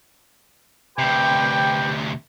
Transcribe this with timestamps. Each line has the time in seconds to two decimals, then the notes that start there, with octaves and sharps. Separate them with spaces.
0.99 D2 C3 G4 B4 G5